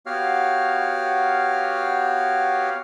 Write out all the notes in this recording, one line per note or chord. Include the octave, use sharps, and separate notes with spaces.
B3 F#4 G4 C#5 F5 F6